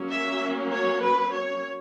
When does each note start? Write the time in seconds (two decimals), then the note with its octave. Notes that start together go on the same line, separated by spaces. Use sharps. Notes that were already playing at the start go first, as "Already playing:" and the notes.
Already playing: F#3 A#3 C#4
0.08 E5
0.71 C#5
1.01 B4
1.30 C#5